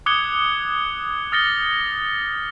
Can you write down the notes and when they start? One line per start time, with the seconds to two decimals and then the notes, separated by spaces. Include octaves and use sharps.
0.06 D6 D#6 F#6 G#6 C#7 G7
1.32 D#6 F6 A6 A#6 C#7 G7